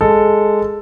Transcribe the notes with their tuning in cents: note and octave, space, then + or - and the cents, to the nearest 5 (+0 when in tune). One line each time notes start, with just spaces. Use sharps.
G#3 +0 A4 +0